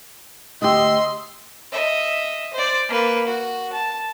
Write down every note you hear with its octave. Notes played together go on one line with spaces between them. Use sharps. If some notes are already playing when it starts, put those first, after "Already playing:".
D2 G4 D#5 C6 E6
D#5 E5
C5 D5
A#3 B4
F#4
A5